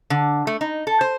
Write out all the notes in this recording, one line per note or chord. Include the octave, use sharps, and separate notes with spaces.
D3
A3
D#4
A4
C5